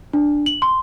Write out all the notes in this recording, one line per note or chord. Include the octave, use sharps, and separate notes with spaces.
D4
F#7
C6